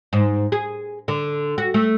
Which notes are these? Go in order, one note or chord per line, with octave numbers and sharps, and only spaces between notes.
G#2
G#4
D3
F#4
A3